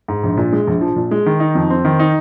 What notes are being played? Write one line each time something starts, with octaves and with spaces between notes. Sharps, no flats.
G#2
A#1
A#2
G#3
A#1
F3
A#2
G#3
D#3
D#4
F2
C4
D#3
D#4